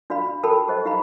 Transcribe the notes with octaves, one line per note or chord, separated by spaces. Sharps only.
D4 F#4 D5 F5 B5
F#4 A4 A#4 G5 A5 B5
G4 C5 D#5
D#4 G4 F5 A#5 B5